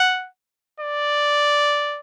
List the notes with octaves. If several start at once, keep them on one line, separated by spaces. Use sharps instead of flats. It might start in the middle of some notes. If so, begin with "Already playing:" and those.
Already playing: F#5
D5